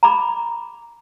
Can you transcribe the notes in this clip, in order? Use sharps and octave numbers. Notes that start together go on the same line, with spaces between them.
A#5 B5 D6